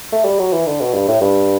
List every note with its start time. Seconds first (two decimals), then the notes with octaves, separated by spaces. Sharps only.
0.12 A3
0.25 G3
0.39 F#3
0.53 E3
0.66 D3
0.81 B2
0.94 G2
1.08 A2
1.21 G2